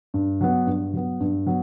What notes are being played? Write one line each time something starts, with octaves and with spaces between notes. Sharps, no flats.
G2
F#3 B3
G2
F#3 B3
G2
F#3 B3